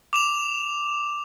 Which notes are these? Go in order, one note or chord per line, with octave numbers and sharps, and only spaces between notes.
D6 E7 F7